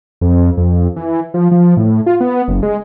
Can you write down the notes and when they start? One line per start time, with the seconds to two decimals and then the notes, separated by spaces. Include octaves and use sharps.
0.21 F2
0.57 F2
0.96 E3
1.34 F3
1.51 F3
1.77 A2
2.06 F4
2.20 B3
2.48 F#1
2.63 G#3